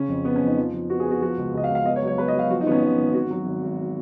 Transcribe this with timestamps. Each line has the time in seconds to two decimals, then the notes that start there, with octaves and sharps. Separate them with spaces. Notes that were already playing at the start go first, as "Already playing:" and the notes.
Already playing: C#3 C#4
0.08 F2
0.25 B3
0.36 C#4
0.41 F2 D#4
0.57 F3
0.74 F3
0.89 B3 F#4
1.00 G#4
1.05 B3
1.11 F#4
1.22 F3 F#4
1.37 C#2
1.53 C#2 D#5
1.64 F5
1.70 C#2
1.75 F5
1.85 B3 D#5
1.96 C#5
2.02 F#3
2.08 C#5
2.17 B3 B4
2.28 D#5
2.33 F#3
2.39 F5
2.50 F3 F#4
2.61 D#4
2.66 G#1 B3
2.72 C#4
2.82 G#1 D#4
2.98 G#1
3.14 G#1 F#4
3.30 F#3
3.46 G#1
3.63 G#1